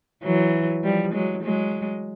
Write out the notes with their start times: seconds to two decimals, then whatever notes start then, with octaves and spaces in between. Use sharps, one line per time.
0.23 E3 F#3
0.84 F3 G3
1.13 F#3 G#3
1.43 F#3 G#3